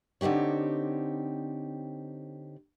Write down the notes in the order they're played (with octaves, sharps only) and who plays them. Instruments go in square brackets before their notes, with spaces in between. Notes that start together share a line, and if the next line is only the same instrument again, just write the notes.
[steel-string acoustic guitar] D3 C4 D#4 G4 C#5